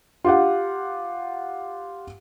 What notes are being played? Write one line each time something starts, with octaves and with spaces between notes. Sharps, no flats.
F4 G4 F#5